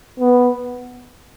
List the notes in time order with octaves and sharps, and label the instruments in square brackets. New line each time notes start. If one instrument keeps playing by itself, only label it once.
[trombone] B3